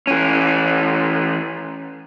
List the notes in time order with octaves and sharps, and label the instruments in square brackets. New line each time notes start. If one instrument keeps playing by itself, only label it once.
[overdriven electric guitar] E3 C#4